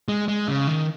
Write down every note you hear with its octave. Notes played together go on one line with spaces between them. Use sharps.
G#3
G#3
C#3
D#3